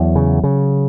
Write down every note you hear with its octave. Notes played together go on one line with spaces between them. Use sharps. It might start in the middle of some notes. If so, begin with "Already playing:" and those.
Already playing: E2 F#3
C#3
C#3